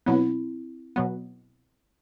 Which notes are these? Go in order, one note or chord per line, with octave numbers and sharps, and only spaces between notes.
B2 F#3 B3 C4 E4
B2 F#3 B3